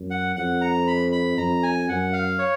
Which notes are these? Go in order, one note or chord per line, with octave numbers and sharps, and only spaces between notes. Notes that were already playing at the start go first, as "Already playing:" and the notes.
Already playing: F#2
F#5
F2 F#5
A#5
B5
B5
F2 A#5
G#5
F#2 F#5
F5
C#5